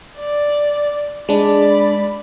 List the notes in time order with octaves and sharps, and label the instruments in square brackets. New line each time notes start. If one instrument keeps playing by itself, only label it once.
[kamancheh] D5
[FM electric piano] G#3 D4 [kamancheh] D5 B5